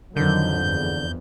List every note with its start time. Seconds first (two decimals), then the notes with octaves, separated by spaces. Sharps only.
0.16 F2 D3 D#3 F#3 G6
0.61 E2 G2